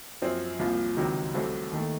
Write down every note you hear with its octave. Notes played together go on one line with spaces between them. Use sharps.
F#2 F3 C4
C2 A#2 F3
C#2 C3 D#3 F#3
C2 C3 F#3 A3 C4
D#2 D#3 A3